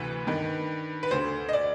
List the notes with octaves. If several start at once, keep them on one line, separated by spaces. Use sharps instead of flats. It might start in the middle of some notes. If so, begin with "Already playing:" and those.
Already playing: D2 C3 E3 B4
G2 D#3
B4
D2 D3 C5
D#5
D5